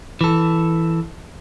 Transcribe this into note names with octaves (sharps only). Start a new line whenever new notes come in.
E3 A4